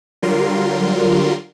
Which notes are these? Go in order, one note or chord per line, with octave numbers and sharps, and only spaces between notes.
D3 F#3 G3 F4 A#4 C6